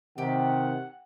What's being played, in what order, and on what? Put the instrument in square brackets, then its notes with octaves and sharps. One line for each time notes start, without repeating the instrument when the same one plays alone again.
[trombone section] C3 D#3 [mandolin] G4 [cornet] F#5